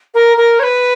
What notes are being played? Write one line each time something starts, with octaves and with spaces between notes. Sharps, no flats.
A#4
A#4
C#5
B4